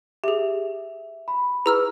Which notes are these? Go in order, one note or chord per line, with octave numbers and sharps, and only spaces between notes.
G4 G#4 E5
B5
E4 G#4 B4 A#5 E6 F6